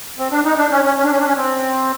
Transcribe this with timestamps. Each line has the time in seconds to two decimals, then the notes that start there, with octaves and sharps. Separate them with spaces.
0.19 C4
0.32 D4
0.45 D#4
0.58 D4
0.71 C#4
0.84 C#4
0.97 C#4
1.04 D4
1.11 C#4
1.19 D4
1.26 C#4
1.36 C4